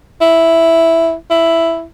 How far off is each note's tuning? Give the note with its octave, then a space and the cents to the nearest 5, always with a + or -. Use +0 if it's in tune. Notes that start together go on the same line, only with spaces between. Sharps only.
E4 +0
E4 +5